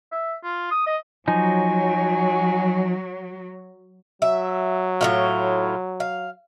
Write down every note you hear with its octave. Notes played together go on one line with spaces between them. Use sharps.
E5
F4
D#6
D#5
F3 F#3 D#4 G#5
F#3 E5
A2 C#3 F4
F5